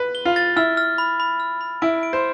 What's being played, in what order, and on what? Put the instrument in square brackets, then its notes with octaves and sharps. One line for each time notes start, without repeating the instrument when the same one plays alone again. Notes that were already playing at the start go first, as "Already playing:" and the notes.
Already playing: [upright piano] B4
[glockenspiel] G7
[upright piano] F4
[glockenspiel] A6
[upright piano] E4 [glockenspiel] F6
[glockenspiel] F6
B5
B5
F6
B5
[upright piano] E4 [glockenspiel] D7
[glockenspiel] D7
[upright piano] C5